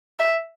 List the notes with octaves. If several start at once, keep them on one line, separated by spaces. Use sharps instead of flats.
E5